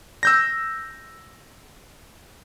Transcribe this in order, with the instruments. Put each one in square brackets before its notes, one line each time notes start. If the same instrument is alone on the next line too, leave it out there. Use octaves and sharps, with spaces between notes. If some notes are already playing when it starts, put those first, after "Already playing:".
[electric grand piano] E6 G6 A#6